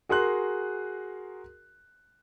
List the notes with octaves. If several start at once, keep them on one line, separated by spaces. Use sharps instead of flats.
F#4 G#4 A#4 C6 F#6